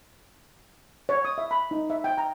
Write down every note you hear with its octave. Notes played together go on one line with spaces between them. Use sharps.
C#5
D#6
E5
B5
D#4
E5
G5
A#5